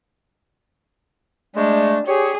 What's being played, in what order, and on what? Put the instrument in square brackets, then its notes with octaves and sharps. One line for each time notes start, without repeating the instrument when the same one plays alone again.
[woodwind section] G#3 A3 [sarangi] D4
[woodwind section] G4 C#5 [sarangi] G#4